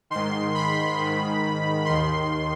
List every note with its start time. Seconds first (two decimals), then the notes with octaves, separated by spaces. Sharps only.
0.10 G#2 D#3 C6
0.55 B5
0.99 G#2 D#3
1.85 D#2 D#3 C6